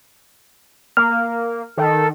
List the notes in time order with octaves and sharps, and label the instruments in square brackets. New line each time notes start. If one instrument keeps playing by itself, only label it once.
[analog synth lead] A#3 [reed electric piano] F6
[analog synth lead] D#3 [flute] A4